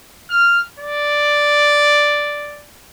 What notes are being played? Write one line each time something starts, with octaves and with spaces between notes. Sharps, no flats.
F6
D5